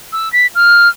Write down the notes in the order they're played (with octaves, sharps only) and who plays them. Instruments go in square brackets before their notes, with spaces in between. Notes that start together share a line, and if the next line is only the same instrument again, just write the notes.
[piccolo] E6
B6
F6